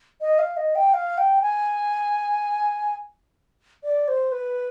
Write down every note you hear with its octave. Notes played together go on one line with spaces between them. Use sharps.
D#5
F5
D#5
G5
F5
G5
G#5
D5
C5
B4